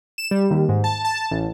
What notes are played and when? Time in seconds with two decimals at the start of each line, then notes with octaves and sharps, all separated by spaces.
0.18 E7
0.31 G3
0.50 D#2
0.69 G#2
0.84 A5
1.05 A5
1.31 A1